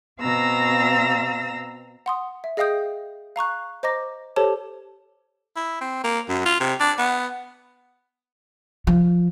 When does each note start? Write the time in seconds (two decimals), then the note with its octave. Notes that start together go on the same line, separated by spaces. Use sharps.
0.20 B2 C4 F5 A#5 E6 A#6
2.06 F#5 C6 D#6
2.44 E5
2.57 G#4 D#5 F5 G5 D#6 G6
3.36 F5 A#5 C#6 F#6
3.83 C5 D#5 A#5 D6 A#6
4.36 G4 A4 C5 C#5 A5
5.56 E4
5.81 C4
6.03 A#3
6.28 F#2
6.45 F4
6.60 C3
6.80 D4
6.98 B3
8.87 F3